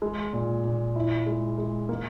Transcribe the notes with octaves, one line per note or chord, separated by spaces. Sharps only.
G#3
A#2
A#2
E4
G#3
G#3
A#3